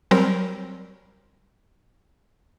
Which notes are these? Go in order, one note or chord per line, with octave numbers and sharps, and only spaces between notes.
F#3 G3 C4 A#4